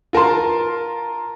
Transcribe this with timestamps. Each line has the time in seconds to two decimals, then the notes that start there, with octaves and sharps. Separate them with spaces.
0.13 F4 A#4 A5 C6